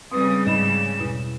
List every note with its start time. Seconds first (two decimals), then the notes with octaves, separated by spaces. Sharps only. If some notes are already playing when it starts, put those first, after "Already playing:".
0.12 C#3 G3 C4 B4 D#6
0.47 G#2 D#5 B5 E7
0.99 E2 B2 E4